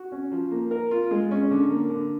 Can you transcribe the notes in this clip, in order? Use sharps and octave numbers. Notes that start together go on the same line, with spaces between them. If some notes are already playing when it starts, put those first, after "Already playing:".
Already playing: F#4
C#4
F3
A#3
A#4
F4
G#3
C#4
D3
A#3
D3